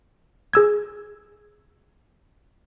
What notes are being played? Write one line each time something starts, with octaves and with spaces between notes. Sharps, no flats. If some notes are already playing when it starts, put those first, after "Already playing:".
G#4 E6 G#6